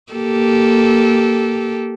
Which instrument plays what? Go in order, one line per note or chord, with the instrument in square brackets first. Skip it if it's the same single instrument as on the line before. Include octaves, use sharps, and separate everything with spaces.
[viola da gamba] A#3 G4 A4